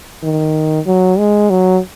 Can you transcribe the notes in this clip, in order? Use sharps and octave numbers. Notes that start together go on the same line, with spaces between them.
D#3
F#3
G#3
F#3